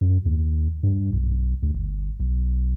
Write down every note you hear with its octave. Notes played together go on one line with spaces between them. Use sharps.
F#2
D#2
G2
B1
D2
G1
B1